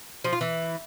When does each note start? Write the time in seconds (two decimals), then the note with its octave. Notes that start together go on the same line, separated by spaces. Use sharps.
0.24 F3
0.33 F4
0.41 E3